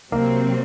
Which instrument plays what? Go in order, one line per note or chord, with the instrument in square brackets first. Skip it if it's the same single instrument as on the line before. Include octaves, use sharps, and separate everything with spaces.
[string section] C3 F#3 C4 [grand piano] A#3